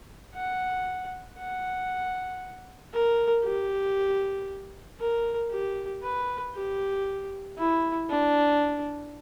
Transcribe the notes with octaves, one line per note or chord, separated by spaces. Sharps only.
F#5
F#5
A#4
G4
A#4
G4
B4
G4
E4
D4